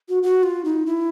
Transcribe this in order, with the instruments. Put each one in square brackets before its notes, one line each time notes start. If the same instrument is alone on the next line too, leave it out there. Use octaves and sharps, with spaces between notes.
[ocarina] F#4
F#4
F4
D#4
E4